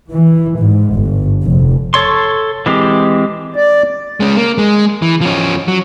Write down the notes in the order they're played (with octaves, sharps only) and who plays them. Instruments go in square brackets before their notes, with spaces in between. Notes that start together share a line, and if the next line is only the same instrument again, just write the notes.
[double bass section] E3
G#2
G1
F1
[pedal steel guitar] A4 C#5 C6
E3 G#3 C4 G4
[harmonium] D5
[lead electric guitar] G#3 C#4
A#3
G#3
E3
F3 C#4
F#3